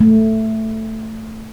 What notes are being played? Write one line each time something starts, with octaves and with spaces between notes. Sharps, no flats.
A3